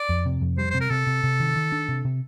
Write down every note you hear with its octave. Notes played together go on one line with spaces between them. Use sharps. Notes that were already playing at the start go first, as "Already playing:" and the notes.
Already playing: D5
F2
C3
F2
G3 C5
C3 C5
A#4
C3 A4
C3
C3
D#3
D#3
D4
C3
C3